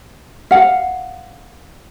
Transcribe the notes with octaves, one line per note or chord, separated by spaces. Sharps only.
F5 F#5